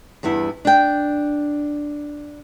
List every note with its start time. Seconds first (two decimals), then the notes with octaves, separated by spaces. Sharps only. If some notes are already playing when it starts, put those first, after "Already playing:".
0.23 E2 G2 B3 E4
0.65 D4 G5